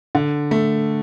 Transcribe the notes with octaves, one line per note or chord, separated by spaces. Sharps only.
D3
A3